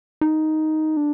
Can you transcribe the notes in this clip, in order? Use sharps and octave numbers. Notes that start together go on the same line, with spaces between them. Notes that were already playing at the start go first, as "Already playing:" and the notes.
D#4
D4